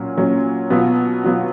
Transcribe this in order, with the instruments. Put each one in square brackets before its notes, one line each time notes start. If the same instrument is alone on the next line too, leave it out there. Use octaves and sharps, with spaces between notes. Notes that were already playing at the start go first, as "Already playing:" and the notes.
Already playing: [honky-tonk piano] A#2 F#3 C#4
A#2 F#3 C#4
B2 F#3 B3 F4
B2 F#3 B3 F4